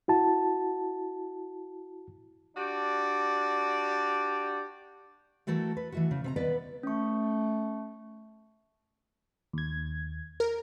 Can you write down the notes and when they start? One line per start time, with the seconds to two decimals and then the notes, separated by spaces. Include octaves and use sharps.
0.08 E4 F#4 A5
2.55 D4 F#4 G4 D5
5.47 E3 A3 F#4 A4 A#4
5.77 B4
5.92 E3 A3 F#4
6.11 C#3
6.24 C3 F5 A#5
6.36 D#2 B3 B4 D5
6.83 A3 C#4 C#6
9.53 D#2 G#6
10.40 A#4